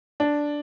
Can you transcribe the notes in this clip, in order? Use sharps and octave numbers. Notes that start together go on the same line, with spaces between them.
D4